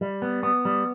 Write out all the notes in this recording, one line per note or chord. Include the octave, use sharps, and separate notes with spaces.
G3
B3
B3
G3